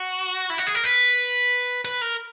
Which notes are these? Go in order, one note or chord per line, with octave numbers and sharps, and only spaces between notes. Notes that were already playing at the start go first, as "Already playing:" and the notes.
Already playing: F#4
E4
F#4
G#4
A#4
B4
B4
A#4